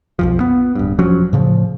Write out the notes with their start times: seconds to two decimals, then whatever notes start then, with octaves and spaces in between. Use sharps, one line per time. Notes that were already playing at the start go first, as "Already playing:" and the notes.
0.19 B1 F2 F3
0.40 B3
0.75 D1 G2
0.98 E1 F3 F#3 C#4
1.33 A2 C#3 F3